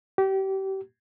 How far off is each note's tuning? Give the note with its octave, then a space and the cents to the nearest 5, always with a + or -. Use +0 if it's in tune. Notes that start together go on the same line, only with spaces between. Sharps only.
G4 -30